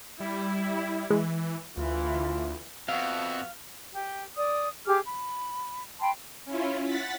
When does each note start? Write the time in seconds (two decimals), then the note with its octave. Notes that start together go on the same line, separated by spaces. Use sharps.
0.20 G3 E4
1.10 E3 G#3
1.77 D2 E3 E4 F4
2.89 F2 B3 F#4 E5 F5
3.91 G4
4.36 D5 D#6
4.86 G4 G#4 D6 F6
5.04 B5
6.00 G5 A5 B5 C6
6.45 C#4 E4 F4
6.83 F#5 A6 B6